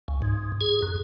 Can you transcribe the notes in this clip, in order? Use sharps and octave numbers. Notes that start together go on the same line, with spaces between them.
C#2
G#2
G#4
F#2